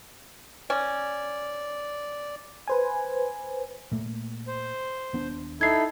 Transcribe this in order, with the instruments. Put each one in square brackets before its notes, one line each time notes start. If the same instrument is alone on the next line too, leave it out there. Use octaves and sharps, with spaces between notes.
[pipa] C#4 [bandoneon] D5
[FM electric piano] B4 C5 G#5
[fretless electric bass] A#2 A3 A#3
[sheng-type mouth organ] C5
[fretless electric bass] D#1 B3 D4
[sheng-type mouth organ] D#4 E4 A4 [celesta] G#6 C7